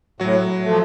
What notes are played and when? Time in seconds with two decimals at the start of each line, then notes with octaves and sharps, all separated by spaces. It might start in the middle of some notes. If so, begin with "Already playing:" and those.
0.20 A2 F#3 F#4
0.64 F3 A3